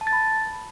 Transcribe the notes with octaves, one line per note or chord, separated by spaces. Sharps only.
A5
A6
B5